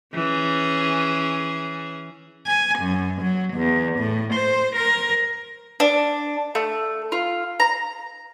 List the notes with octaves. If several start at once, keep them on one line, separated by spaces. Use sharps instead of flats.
E3 C#4 G#4
G#5
F#2
F#3
E2
A2
C5
A#4
D4
A3
F4
A#5